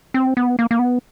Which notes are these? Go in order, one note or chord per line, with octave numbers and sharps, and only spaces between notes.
C4
B3
A#3
A#3
B3